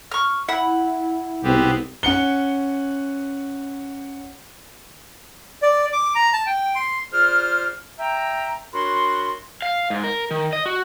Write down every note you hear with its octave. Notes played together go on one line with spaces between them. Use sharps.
C#6 F6
E4 F#5 B5
C2 G#2 B2 B3 C4 G4
C#4 F#5 C#7 G7
D5
D6
A#5
A5
G5
C6
F4 G#4 C5 D5 F6
E5 G5 A#5
D4 F#4 A#4 C#5 B5 C6
F5
G#2
A#4
D#3
D#5
F#4